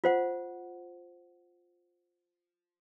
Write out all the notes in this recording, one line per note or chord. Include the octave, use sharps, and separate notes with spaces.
F4 C5 F#5